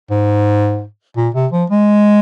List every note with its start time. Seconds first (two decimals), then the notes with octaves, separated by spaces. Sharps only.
0.10 G#2
1.17 A#2
1.35 C3
1.52 F3
1.70 G#3